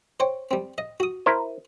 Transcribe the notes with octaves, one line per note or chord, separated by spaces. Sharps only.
C5 C#5 G5
G3 C4
D#5
F#4 D#6
E4 A#4 C5